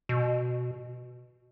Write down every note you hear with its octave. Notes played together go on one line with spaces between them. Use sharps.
B2